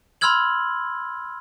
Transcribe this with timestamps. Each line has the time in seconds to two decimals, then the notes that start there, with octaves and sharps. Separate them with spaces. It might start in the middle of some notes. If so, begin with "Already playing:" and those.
0.21 B5 C6 E6 F6 G#6 F#7